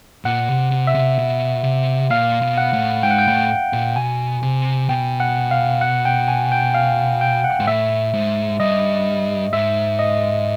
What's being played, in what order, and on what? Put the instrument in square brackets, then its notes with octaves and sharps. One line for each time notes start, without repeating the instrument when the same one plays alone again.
[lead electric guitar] A#2 [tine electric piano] F#5
[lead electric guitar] C3
C3
[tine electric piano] E5
[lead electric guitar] C3
B2
C3
[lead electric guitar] A#2 [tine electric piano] F5
[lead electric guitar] B2
[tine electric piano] F#5
[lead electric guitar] A2
[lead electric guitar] G#2 [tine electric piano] G5
[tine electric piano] F#5
G5
[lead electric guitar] A2
A#2
[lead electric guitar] B2 [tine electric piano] G#5
[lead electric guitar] C3
[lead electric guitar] B2 [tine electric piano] G5
[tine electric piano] F#5
F5
F#5
G5
G#5
G5
F5
G5
F#5
[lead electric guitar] G#2
[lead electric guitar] A2 [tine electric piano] E5
[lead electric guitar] G#2
[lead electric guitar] G2 [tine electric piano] D#5
[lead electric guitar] G#2 [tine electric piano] E5
[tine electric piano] D#5